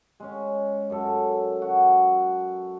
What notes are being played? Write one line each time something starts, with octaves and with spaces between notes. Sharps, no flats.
G#3 C#4
F#2 A4
F#4